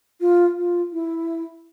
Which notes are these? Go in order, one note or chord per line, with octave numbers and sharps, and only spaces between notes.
F4
F4
E4